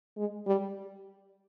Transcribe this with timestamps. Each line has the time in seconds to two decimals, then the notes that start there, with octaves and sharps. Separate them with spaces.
0.17 G#3
0.47 G3